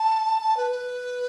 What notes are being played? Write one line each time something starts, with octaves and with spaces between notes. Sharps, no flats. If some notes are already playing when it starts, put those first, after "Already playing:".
Already playing: A5
A5
B4
B4